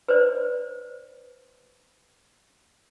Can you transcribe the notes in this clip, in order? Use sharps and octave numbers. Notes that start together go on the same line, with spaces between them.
B4 C5 D5